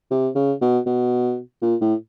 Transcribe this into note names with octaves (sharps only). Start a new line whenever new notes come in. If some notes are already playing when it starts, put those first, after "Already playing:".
C3
C#3
B2
B2
A#2
A2